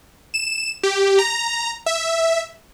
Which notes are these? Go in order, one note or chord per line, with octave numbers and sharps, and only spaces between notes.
E7
G4
A#5
E5